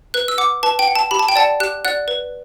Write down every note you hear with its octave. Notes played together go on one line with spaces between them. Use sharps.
B4 F#6
E6
F#5 D6
B4 A5
G5
F#5
A5
G4 B5
A5
G5
D5 F#5 A5
G4 F#6
D5 F#5 F#6
B4